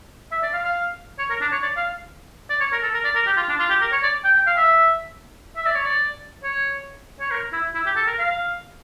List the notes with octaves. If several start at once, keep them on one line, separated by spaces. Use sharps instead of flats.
E5
D5
F5
F5
C#5
A#4
D4
C#5
D5
F5
D5
C#5
A#4
A4
A#4
D5
A#4
G4
F4
D4
F4
G4
A#4
C#5
D5
G5
G5
F5
E5
E5
D5
C#5
D5
C#5
C#5
A#4
E4
E4
G4
A4
A#4
F5